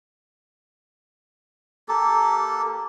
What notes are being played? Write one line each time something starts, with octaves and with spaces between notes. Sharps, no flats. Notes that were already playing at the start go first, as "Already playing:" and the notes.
A#3 G4 A4